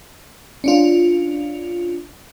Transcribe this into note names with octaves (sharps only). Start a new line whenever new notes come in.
C#4 D4 F4